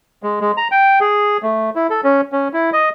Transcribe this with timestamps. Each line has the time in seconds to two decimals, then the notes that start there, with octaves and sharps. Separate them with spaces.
0.23 G#3
0.41 G#3
0.57 A#5
0.71 G5
1.01 G#4
1.43 A3
1.76 E4
1.90 A4
2.04 C#4
2.32 C#4
2.53 E4
2.73 D#5